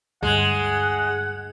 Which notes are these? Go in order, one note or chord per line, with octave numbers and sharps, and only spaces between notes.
D2 G2 G#3 F#5 G#6